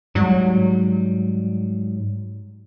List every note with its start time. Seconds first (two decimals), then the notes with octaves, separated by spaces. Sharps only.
0.15 G#2 F#3 G3